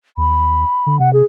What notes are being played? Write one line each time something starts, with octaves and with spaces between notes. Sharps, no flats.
D#2 B5
D3
C3 F#5
G#4